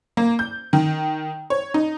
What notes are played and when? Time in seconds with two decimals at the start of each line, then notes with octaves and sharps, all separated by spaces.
0.17 A#3
0.39 G6
0.73 D#3
1.50 C#5
1.74 D#4